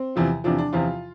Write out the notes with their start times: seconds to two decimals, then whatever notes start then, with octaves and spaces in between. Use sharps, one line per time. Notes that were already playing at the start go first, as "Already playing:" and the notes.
Already playing: C4
0.16 E2 C3 F3
0.44 E2 C3 F3 D4
0.58 D4
0.73 E2 C3 F3 F4